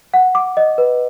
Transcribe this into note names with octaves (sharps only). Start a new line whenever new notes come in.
F#5
D6
D#5
B4